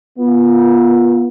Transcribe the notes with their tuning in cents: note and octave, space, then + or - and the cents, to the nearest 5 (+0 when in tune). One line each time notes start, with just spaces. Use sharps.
B3 -30 F4 +0